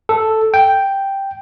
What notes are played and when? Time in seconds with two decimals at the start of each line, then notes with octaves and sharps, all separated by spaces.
0.09 A4
0.54 G5